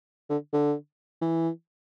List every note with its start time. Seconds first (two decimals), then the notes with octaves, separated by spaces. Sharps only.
0.30 D3
0.53 D3
1.22 E3